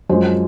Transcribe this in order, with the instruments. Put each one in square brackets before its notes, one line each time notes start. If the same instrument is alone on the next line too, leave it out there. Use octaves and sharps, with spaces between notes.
[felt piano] F#2 F3 G#3 C5